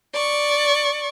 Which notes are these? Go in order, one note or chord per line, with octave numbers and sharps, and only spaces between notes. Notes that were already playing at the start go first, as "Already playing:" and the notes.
D5 C#6